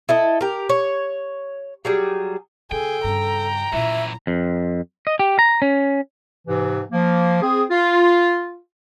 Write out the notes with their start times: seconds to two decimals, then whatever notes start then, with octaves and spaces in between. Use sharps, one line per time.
0.09 E4 A4 D#5
0.41 G4 A#4
0.69 C#5
1.85 F#3 G3 G#4
2.72 C#3 G#4 A4 G5
3.04 G2 C#3 A#5
3.73 F#2 A#2 E3 E4 E5
4.27 F2
5.07 D#5
5.19 G4
5.39 A#5
5.62 C#4
6.47 G#2 C3 E3
6.92 F3 A#3
7.41 C4 G#4
7.70 F4